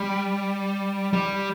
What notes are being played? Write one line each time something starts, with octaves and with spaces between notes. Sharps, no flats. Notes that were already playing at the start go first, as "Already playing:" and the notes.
Already playing: G3
G3